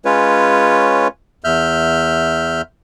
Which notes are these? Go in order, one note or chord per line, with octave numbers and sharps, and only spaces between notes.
G#3 C#4 F4 B4 C#5
E2 E5 F6 G6